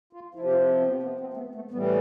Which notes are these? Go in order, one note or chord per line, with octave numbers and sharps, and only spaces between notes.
F4
C3 F3 E4
G4
F4
C4
B3
B3
C4
A3
B3
A3
A2 E3 G3 B3